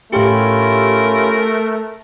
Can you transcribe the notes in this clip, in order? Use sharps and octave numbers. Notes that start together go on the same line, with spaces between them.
A2 A3 C#4 E4 F4 G4 A#4